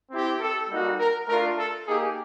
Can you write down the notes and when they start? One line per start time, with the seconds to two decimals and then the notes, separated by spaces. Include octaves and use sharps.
0.09 C4 E4 G4
0.39 A4
0.68 G3 A#3 D#4 F#4
0.98 A#4
1.27 A3 D4 F4 A#4
1.57 A4
1.86 A#3 D#4 G4 G#4